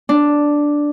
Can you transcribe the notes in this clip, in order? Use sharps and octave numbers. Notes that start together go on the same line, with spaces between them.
D4